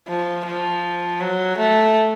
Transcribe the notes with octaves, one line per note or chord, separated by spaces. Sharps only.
F3
F3
F#3
A3